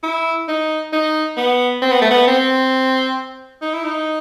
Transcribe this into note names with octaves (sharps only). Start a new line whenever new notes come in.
E4
D#4
D#4
B3
C4
B3
A3
B3
C4
D#4
E4
D#4